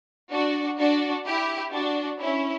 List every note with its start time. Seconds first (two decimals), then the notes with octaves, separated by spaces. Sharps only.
0.32 D4 F#4
0.79 D4 F#4
1.26 E4 G4
1.73 D4 F#4
2.20 C#4 E4